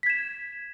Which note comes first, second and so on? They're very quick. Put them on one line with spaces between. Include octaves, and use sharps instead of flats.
B6 G#6 E7